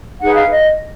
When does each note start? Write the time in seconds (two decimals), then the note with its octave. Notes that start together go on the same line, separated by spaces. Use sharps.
0.20 D#4 G#4 B4 F#5
0.35 F5
0.51 D#5